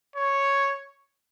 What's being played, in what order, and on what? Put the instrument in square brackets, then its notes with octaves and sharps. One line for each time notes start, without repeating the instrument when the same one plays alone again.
[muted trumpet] C#5